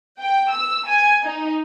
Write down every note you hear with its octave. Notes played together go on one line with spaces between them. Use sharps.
G5
E6
G#5
D#4